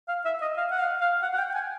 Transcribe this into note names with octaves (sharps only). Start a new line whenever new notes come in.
F5
E5
D#5
F5
F#5
F5
F5
F#5
F#5
G5
G5
G#5